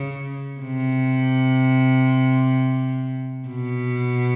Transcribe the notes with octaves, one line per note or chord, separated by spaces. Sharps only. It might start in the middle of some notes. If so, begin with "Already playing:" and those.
Already playing: C#3
C3
B2